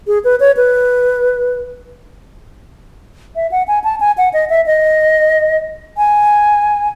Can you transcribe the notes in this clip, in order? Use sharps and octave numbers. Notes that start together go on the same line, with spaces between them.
G#4
B4
C#5
B4
E5
F#5
G#5
A5
G#5
F#5
D#5
E5
D#5
G#5